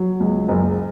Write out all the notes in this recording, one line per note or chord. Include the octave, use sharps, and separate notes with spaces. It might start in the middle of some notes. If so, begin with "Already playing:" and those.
Already playing: F#3
C#2
F#1